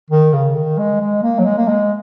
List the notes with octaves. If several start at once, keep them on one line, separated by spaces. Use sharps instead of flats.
D#3
C#3
D#3
G#3
G#3
A#3
F#3
G#3
A#3
G#3